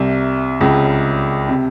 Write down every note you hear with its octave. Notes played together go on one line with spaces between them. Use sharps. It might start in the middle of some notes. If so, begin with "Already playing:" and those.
Already playing: C2 C3
C#2 C#3
C3